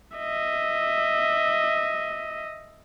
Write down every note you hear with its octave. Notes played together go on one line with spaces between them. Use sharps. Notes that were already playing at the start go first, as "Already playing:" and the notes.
D#5 E5